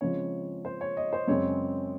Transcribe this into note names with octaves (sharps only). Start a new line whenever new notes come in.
C#3 F3 G#3 C4 C#5
C5
C#5
D#5
C5
F#2 C#3 G#3 C4 C#5